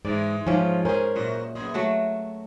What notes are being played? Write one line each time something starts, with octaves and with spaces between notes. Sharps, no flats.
G#2 E3 G#3 D5
G#2 F3 C#4 F4
C#4 G#4 A#4 C5
F#2 A#2 F#4 D#5
F#2 B3 G#4 D#5
F#3 A3 F#4 E5